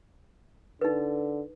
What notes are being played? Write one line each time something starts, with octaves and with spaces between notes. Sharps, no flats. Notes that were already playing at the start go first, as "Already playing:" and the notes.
D3 D#4 B4